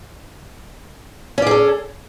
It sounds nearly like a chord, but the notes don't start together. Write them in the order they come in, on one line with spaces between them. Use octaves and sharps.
C#4 D5 G#4 A4